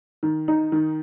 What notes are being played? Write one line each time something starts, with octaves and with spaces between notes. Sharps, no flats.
D#3
D#4
D#3